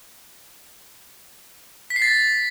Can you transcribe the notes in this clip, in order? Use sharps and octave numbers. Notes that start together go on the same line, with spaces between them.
B6
C7
A6